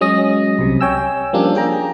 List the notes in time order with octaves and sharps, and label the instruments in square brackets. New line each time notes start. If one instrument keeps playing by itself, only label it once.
[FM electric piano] F#3 G#3 C#4 D#5 D#6 A#6
C2 C3
C#5 G5 G#5 E6
F3 G3 A#3 C#4 D4
G#4 G5 A#5